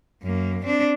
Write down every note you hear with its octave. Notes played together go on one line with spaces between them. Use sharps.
F#2 A#3
C4 D4